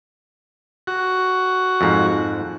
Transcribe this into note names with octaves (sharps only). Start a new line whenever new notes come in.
F#4
F2 G#2